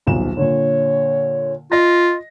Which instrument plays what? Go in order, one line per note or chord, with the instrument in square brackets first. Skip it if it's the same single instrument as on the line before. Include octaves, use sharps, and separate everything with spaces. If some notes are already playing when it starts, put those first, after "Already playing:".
[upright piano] D#1 B1 E7
[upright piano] A#2 D3 [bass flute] C#5
[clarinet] F4 [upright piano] D#5 A#6